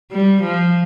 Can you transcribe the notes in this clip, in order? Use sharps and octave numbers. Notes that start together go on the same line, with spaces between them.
G3
F3